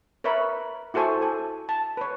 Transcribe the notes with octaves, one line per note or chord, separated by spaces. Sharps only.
A#4 B4 C#5 E5 B5
E4 F#4 A4 C5 G#5 C#6
A4 G#5
A5
B4 C#5